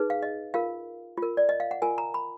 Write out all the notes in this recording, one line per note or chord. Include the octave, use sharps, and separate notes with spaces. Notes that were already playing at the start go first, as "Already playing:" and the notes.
Already playing: D#4 G#4 B4
F5
D#5
F4 A#4 F5
F4
A#4
D5
D#5
F5
F#5
F4 A#4 G#5
A#5
B5